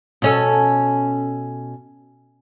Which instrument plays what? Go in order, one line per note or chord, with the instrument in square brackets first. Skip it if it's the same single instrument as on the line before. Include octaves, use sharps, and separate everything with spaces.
[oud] B2 C#4 A4